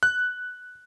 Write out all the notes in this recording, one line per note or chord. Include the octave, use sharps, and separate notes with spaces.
F#6